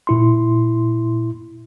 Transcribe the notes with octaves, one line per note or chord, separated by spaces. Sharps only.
A#2 E4 C6